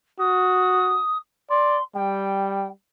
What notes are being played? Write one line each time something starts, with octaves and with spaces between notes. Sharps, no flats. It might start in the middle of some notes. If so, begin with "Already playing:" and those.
F#4 D#6
D5 C6
G3 G5